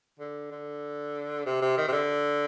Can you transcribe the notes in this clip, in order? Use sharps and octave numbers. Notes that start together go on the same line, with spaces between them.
D3
D3
C3
C3
D#3
C3
D3